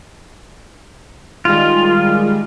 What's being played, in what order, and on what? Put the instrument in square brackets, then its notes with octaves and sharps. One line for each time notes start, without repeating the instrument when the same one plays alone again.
[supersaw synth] D#3 G3 G#3 [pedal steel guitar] F4